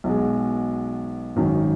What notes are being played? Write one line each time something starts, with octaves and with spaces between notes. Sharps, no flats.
B1 B2 G#3
G#1 F#2 D#3